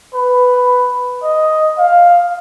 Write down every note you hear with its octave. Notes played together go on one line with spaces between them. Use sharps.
B4
D#5
F5